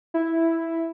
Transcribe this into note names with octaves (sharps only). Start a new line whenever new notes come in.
E4